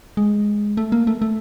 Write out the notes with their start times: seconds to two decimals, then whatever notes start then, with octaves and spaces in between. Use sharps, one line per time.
0.17 G#3
0.77 A3
0.92 A#3
1.07 A3
1.22 A3